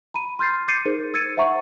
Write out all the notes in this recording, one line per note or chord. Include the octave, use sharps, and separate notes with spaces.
A#5 B5 D#7
C6 F6 G6 A6 C7
D6 G6 A6 C7 C#7 D#7
D#4 G#4 A#4 C5
E6 G#6 A6 C#7 D#7
C5 E5 F#5 A#5 C#6